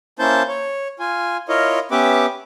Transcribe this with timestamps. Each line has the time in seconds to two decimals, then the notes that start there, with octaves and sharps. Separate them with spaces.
0.19 A#3 C#4 E4 C5 A5 G6
0.48 C#5
0.99 F4 G#5
1.49 E4 F4 A#4 C#5 D#5
1.91 B3 C#4 G4 B4 E5 D6